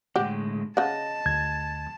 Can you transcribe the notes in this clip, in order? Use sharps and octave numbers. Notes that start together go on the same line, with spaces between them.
A2 D3 G#3 G4 F#5
C#3 D#5 F#5 A5
D2 G#6